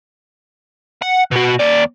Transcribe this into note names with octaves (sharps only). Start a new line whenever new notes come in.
F#5
B2 F#4
D#2 D5